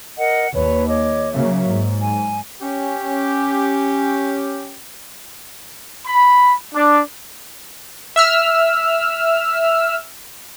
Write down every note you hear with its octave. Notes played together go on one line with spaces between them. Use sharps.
A#4 D#5 F#5
D#2 B4 C#5
C#5 D#5 D6
C#3 F#3 A#3 E5
G#2
G#5
C#4 G4
B5
D4
E5 E6 F6